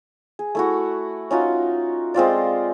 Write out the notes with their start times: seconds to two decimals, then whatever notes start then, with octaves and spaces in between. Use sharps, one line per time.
0.39 G#4
0.55 A3 E4 F#4
1.31 C#4 D#4 F4 F#4
2.14 G#3 C4 F4 D5